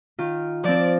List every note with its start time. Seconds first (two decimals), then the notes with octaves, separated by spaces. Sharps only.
0.19 D#3 F4
0.64 F3 C4 D5